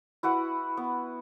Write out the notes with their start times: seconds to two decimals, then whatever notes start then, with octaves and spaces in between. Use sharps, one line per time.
0.23 E4 F#4 B4 F#5
0.77 B3